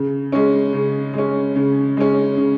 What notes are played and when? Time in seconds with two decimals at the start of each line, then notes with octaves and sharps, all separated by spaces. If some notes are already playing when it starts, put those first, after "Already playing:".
Already playing: C#3
0.32 G#3 C#4
0.73 C#3
1.14 G#3 C#4
1.56 C#3
1.97 G#3 C#4
2.37 C#3